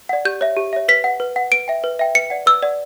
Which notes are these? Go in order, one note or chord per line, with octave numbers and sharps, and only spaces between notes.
D5 F#5
G4 G6
C#5 E5
G4
C#5 E5
B4 B6
F#5
B4
F#5
B4 D7
E5 G5
B4
E5 G5
B4 C#7
D5 F#5
B4 E6
D5 F#5